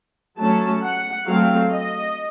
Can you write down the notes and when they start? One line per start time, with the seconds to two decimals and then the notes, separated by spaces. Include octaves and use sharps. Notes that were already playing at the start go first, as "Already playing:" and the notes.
0.37 F#3 A3 C#4 A5
0.83 F#5
1.26 F#3 A3 C4 F5
1.71 D#5